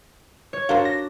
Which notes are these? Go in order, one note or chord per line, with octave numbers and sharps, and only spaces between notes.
C#5
D4 F4 F#4 A#4 C5
A#6